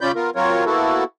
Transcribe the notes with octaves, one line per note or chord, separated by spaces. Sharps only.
C#3 C#4 F4 D5 B5 G6
B3 F4 A#4
F#3 C4 F4 A#4 C#5
A#3 B3 E4 F#4 A4